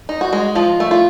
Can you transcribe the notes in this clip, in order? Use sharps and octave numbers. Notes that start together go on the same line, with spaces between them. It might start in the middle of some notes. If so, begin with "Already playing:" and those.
D#4
F#4
G#3
F3 F4
A3
F4